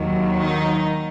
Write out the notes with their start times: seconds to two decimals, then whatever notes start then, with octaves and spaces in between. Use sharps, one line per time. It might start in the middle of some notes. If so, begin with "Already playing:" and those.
Already playing: D#2 D#3 F#3
0.41 D#4